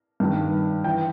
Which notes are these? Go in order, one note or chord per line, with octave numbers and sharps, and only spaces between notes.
G2 D#3
E3 G5